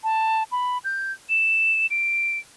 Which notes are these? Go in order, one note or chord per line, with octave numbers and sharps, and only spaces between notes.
A5
B5
G6
E7
D7